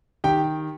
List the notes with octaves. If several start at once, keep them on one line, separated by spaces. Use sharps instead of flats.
D#3 G4 G5